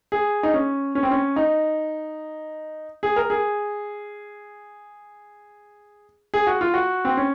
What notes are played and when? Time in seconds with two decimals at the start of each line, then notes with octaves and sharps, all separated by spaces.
0.12 G#4
0.43 D#4
0.54 C#4
0.95 C#4
1.03 C4
1.11 C#4
1.36 D#4
3.03 G#4
3.16 A#4
3.30 G#4
6.34 G#4
6.47 F#4
6.61 F4
6.74 F#4
7.05 C4
7.17 C#4